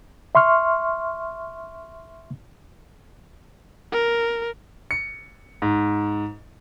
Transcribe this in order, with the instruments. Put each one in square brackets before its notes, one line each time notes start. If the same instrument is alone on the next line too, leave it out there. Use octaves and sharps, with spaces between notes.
[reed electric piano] E5 C6 C#6 F6
[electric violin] A#4
[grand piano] C#7
G#2